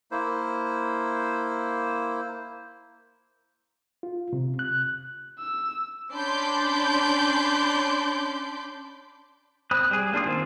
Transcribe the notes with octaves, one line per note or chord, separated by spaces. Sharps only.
A#3 E4 C5
F4
C3
F#6
E6
C#4 D4 B5 C6 D6 G6
C4 B5 D#6 F#6
G3 G#4
A#3 D4 F4 D#6
D#3 C4 F4